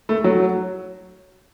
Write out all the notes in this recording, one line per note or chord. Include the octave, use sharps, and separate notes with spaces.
A3
F#3